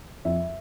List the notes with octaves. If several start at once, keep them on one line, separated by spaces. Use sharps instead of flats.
F2 E5